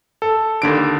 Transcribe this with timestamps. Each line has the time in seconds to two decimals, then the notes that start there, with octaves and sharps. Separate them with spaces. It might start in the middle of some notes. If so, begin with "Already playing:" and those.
0.22 A4
0.62 D#2 D3 D7